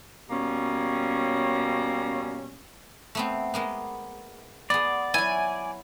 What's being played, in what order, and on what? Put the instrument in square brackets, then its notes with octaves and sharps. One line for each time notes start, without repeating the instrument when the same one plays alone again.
[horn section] B2 G3 A#3 C#4
[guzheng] A3 B3 C4
G#3 A#3 B3
[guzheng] B3 G#4 [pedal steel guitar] D5
[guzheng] F#3 E4 [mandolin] G#5